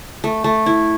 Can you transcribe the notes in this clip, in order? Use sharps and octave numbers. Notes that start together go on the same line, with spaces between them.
A3
A3
E4